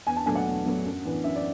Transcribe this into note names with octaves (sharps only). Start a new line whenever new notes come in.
E2 G#5
A5
B2 F#3 A3 D4 G#5
F#5
E2
B2 F#3 A3 D4
F#2
E3 B3 D4
F#2 E5
D5